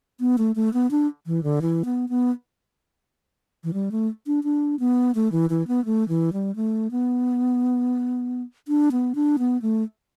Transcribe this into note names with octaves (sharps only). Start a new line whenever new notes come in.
B3
A3
A3
B3
D4
E3
D3
E3
B3
B3
E3
G3
A3
D4
D4
B3
A3
E3
E3
B3
A3
E3
G3
A3
B3
D4
B3
D4
B3
A3